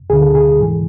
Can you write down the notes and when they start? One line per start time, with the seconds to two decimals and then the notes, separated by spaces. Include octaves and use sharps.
0.10 D2 D3 G#4
0.22 A4
0.35 G#4
0.60 G#2 E3